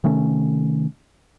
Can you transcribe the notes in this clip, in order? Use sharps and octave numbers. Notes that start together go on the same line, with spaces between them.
C3 D#3 A3 C#4